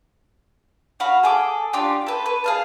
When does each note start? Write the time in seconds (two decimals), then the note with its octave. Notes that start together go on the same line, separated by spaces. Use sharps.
1.00 F#4 F5 B5
1.23 G#4 A4 D6
1.73 D4 F4 G4
2.07 A4 B4
2.26 B4
2.44 G#4 F5 A5